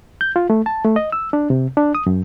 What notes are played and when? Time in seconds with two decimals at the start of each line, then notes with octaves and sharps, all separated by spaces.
0.21 G6
0.36 F4
0.50 A3
0.66 A5
0.84 A3
0.96 D#5
1.12 E6
1.33 D4
1.50 C3
1.77 D4
1.95 D#6
2.06 F#2